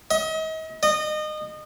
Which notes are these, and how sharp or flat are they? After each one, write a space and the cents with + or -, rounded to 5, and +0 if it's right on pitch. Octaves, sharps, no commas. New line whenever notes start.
D#5 +40
D#5 -25